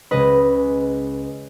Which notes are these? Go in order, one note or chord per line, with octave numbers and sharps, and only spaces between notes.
C#2 C#3 G#3 B4 D#5